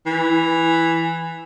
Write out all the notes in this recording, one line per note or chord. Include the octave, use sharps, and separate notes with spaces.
E3